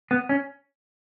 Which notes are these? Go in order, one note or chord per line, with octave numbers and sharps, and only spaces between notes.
B3
C#4